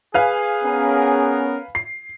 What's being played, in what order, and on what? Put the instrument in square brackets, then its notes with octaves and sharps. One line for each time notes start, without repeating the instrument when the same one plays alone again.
[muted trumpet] G#4 [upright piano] B4 F5 G#5
[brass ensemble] B3 C#4 A#4
[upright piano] C7